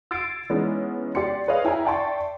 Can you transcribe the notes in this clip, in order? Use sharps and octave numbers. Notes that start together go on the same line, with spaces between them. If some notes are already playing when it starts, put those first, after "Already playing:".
E6 G#6 A6 C7 D7
E3 G#3 B3 C#4 D#4
G4 D5 C6 C#7
G#4 B4 C#5 D#5 F5
E4 G5 G#5 A#5
D5 E5 G5 A5 C6 C#6